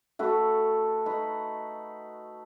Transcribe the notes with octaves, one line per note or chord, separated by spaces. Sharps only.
A3 F#4 A4 B4
D#4 B4